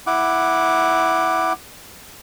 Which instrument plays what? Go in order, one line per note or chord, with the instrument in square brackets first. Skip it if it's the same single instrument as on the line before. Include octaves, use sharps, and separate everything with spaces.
[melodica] E4 F#5 D6